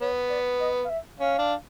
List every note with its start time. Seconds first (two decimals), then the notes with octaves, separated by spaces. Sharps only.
0.01 B3 C#5
0.30 D5
0.61 D#5
0.85 F5
0.89 E5
1.19 C#4 F5
1.39 D4